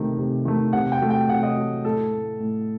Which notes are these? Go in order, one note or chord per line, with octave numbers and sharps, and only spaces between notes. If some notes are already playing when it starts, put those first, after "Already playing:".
Already playing: C3 D#3 A3
C3
D#3 A3
C3 F#5
G5
F#3 A3
G5
C3 F#5
D#5
F#3 A3
A2 A4
A3
A2